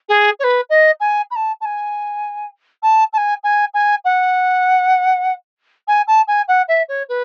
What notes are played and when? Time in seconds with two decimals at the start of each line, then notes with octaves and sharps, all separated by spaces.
0.08 G#4
0.39 C#5
0.43 B4
0.69 D#5
1.00 G#5
1.30 B5
1.35 A5
1.60 A5
1.65 G#5
2.82 A5
3.13 A5
3.17 G#5
3.43 G#5
3.74 G#5
4.04 F#5
5.87 G#5
6.07 A5
6.27 G#5
6.48 F#5
6.68 E5
6.88 C#5
7.08 B4